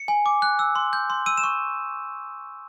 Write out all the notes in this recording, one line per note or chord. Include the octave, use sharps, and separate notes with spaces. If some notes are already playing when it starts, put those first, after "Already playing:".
Already playing: C#7
G#5
D6
F#6
E6
C6
G6
C6
E6 D#7
E7
C#6